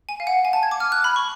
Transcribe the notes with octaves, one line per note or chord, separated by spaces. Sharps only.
G#5
F5
F#5
G#5
A5
G#6
D6
F6
F#6
B5
C#6